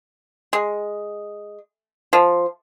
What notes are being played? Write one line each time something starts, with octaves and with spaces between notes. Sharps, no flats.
G#3
F3